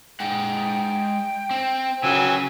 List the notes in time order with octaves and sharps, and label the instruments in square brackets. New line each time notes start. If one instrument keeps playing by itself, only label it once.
[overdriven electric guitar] G#3 F#5 [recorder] G5
[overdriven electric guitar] C4
[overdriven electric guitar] C#3 [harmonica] F#3 G#5 E6